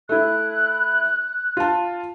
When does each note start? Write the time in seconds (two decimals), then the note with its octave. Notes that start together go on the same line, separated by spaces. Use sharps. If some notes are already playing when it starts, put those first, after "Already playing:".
0.09 A3 E4 F#6
1.57 F4 A5